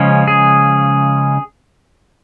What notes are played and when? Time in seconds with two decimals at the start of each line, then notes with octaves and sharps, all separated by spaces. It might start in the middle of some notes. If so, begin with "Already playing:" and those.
Already playing: C#3 F3 G#3 C#4
0.28 G#4